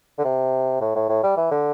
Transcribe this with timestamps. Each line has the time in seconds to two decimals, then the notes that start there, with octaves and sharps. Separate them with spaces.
0.18 D3
0.24 C3
0.81 A2
0.95 A2
1.09 A2
1.23 G3
1.37 E3
1.51 D3